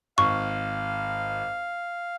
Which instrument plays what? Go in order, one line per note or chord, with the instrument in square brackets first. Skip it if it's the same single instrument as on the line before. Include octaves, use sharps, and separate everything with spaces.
[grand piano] G#1 [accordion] F5 [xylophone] C#6